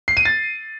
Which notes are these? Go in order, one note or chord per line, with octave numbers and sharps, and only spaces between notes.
C7
D#7
A6